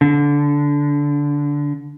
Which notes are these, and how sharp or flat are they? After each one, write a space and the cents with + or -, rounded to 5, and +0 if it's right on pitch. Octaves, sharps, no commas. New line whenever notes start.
D3 -15